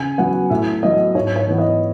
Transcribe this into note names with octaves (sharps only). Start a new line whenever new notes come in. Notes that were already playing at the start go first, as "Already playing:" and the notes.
Already playing: C#3 G#5
F#3 B3 F#5
A2 E5
F#3 B3 D#5
G#2 C#5
C#5
E3 B3
D#5